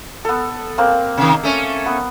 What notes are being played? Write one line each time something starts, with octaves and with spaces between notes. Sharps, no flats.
B3 A4
A#3 C4
C3 D#3
A3 C#4
B3